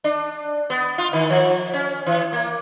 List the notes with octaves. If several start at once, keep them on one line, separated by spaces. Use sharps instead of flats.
D4
B3
F4
D#3
F3
C#4
E3
A#3